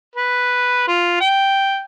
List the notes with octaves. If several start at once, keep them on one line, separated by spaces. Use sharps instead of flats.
B4
F4
G5